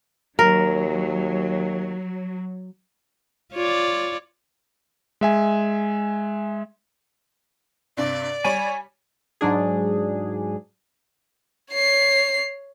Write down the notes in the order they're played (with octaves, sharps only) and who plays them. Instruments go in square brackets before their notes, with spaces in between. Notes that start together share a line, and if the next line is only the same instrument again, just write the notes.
[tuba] D#2 [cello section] F#3 [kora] A#4
[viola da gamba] F4 C#5 D5
[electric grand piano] G#3 E5 G#5
[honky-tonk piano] G2 C3 [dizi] D5
[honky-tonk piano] G3 C#5 [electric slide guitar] G#5
[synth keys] G#2 F#3 D4 G#4
[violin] C#5 C7